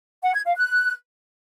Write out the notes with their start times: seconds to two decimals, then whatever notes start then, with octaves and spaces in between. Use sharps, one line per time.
0.23 F#5
0.34 G#6
0.46 F5
0.57 F#6